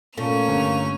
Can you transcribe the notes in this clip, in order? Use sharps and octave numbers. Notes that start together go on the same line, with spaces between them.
A#2 A3 A#3 C#4 F7
G1